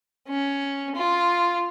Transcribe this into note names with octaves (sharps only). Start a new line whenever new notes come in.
C#4
F4